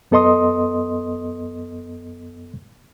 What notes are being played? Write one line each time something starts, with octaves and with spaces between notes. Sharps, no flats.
F#2 B3 A4 D#5 C6 D#6